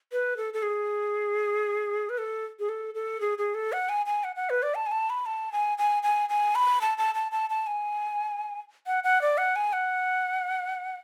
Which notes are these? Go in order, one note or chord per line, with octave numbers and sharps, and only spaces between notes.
B4
A4
A4
G#4
B4
A4
G#4
A4
A4
G#4
G#4
A4
F#5
G#5
G#5
F#5
F#5
B4
D5
A5
G#5
A5
B5
A5
G#5
G#5
G#5
G#5
B5
A5
A5
A5
A5
A5
G#5
F#5
F#5
D5
F#5
G#5
F#5